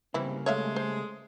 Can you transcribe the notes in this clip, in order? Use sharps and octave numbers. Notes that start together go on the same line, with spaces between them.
E2 G#2 C#3 E3 G3 A#3 C4 E4
G#3 A3 C#5 E5 F5
C5